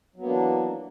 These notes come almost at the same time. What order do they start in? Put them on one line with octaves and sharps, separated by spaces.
F#3 B3 A#3 D4 E3